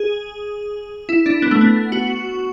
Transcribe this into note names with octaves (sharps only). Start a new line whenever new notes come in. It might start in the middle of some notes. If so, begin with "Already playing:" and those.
Already playing: G#4
E4
D4
B3
A3
B3
F#4